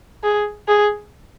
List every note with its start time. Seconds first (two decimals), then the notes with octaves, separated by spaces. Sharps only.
0.23 G#4
0.68 G#4